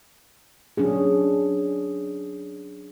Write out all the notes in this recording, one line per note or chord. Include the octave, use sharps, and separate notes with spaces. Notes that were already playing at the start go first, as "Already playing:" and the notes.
F#3 C#4 D4 G#4